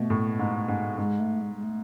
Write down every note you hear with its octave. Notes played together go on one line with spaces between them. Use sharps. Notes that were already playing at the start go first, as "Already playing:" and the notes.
Already playing: B2 A3
A2
G#2
G#2
G#2 G#3
A3
G#3
G#3
A3